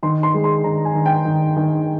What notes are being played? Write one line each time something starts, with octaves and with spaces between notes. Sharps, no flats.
D#3 C6
C6
G#3
C6
D#3 A#5
G#5
D#3
G5
D#3
D#3